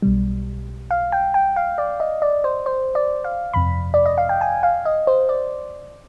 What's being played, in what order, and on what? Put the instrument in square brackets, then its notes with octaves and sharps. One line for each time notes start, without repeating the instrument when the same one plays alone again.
[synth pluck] B1 B2 G3
F5
G5
G5
F5
D5
D#5
D5
C5
C5
D5
F5
G1 F2 C3 B5
D5
D#5
F5
G5
G#5
F5
D#5
C5
D5